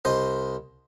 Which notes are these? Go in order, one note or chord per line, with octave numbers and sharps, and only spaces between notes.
C2 C5 D#5